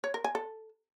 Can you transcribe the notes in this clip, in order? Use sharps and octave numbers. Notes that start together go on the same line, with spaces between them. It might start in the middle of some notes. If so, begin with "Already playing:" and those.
C#5
A#4
G#5
A4